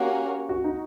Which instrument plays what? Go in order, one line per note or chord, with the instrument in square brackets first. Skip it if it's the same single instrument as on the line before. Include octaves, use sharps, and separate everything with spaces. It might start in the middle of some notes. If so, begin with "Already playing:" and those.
Already playing: [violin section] A#3 C#4 F#4 A#4 [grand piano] G4
[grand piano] F#4
D#4